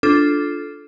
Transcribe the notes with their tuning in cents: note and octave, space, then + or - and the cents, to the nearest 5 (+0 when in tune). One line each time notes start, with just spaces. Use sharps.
D4 -5 F4 +0 A4 -15